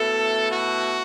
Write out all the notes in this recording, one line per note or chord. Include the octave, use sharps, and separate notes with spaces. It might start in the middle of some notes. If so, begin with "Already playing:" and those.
Already playing: B2 A3 E4 A4
F#4